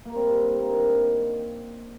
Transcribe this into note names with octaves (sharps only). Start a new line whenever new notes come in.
A#3
G3 C4
G2
A#3
D#3